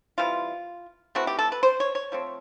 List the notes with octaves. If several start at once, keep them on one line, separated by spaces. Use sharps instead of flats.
E3 G3 C4 F4
E3 A3 C4 F#4
G4
A4
B4
C5
C#5
C#5
F3 A3 C4